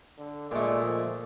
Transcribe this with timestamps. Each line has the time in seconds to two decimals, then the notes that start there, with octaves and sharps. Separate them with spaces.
0.18 D3
0.51 A#2 G#3 A3
0.84 F3